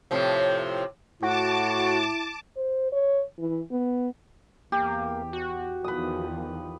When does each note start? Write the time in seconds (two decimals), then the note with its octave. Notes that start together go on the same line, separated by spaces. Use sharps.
0.11 A2 C3 F3
1.22 A2 E4 F#4 A5 D6
2.56 C5
2.92 C#5
3.39 E3
3.72 B3
4.72 E2 A#3 G4
5.33 F#4
5.84 E2 D#3 F3 B4 D#6